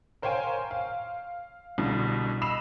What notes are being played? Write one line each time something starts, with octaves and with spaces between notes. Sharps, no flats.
A#4 C5 C#5 F5 G5 G#5
F5
C2 B2 D3
D#5 B5 E6 C7 E7 F7